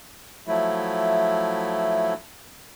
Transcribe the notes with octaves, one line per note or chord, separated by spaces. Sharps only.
F3 F#3 A3 E4